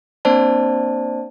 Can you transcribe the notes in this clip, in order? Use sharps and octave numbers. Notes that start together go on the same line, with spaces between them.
A#3 C4 D4 C5 D5 A5